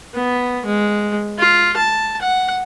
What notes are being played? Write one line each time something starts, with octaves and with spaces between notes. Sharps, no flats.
B3
G#3
F4
A5
F#5